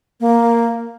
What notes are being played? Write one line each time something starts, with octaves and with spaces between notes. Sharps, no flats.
A#3